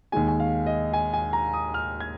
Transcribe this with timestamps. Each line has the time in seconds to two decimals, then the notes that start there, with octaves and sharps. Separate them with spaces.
0.12 D#2 D#3 G#3 G#5
0.28 G#5
0.40 F5
0.66 D#5
0.93 G#5
1.13 G#5
1.33 A#5
1.53 D#6
1.74 F6
2.00 G#6